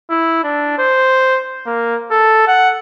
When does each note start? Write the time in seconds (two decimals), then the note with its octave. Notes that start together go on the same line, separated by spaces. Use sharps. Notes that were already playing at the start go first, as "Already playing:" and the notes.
0.10 E4
0.43 D4
0.78 C5
1.66 A#3
2.11 A4
2.47 F#5